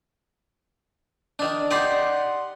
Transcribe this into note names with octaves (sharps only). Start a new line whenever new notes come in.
D#3 D4
D#4 G4 D5 F#5 C6